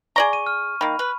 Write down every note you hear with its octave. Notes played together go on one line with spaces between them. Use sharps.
G#4 D5 A#5 C#6
D#7
F6
D#3 A#3 B5
B4